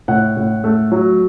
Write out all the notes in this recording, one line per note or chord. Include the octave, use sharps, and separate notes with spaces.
A2 F#5
A2
A3
F#3